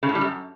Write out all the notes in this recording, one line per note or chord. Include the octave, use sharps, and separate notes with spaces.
C#3
A2
G3
F#2